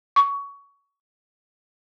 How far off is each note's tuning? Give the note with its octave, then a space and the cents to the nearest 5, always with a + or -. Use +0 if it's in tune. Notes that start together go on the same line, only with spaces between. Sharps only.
C#6 +20